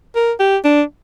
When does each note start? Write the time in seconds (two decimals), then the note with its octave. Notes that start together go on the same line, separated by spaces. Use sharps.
0.15 A#4
0.39 G4
0.64 D4